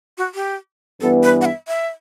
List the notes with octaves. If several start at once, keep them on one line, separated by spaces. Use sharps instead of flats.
F#4
G4
G2 E3 B3 A4
B4
F#5
E5
E5